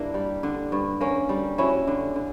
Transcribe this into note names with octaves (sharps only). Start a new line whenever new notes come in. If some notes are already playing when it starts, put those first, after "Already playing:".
Already playing: G2 A#3 D4 E4
G3
D3
G2
A#3 C#4
G3
F#3 C#4 E4
D3
D3